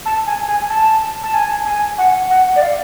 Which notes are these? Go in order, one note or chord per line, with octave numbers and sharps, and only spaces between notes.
A5
G#5
G#5
A5
A5
G#5
G#5
F#5
F#5
D5
F5